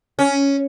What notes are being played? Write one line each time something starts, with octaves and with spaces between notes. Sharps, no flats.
C#4